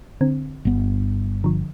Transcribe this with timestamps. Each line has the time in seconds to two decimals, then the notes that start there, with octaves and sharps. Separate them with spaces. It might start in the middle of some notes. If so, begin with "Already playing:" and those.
0.21 D3 C4
0.65 G1 B3
1.44 D3 F3